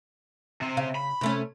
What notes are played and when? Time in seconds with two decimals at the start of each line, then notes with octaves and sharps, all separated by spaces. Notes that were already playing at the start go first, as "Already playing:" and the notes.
0.61 C3 C4
0.77 C#3 F5
0.95 B5
1.21 C3 A3 C#4